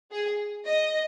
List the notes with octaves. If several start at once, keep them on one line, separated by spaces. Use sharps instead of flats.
G#4
D#5